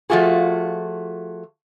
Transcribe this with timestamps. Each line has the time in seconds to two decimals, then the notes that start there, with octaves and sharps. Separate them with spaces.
0.10 F3 A3 F4 F#4 G#4